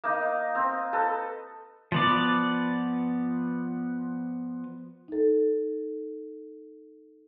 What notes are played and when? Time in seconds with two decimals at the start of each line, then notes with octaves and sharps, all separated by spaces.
0.04 A#3 D#4
0.55 C4
0.93 A4 B4
1.92 F3 B3 D5
5.08 D#4 A4